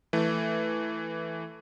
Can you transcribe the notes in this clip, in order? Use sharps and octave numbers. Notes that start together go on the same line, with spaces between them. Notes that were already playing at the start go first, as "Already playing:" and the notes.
E3 A3